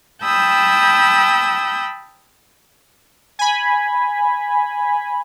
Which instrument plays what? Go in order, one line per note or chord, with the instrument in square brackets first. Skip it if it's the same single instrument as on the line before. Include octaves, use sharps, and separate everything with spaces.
[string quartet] G5 A5 B5 D#6 E6 G6
[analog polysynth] G#5 B5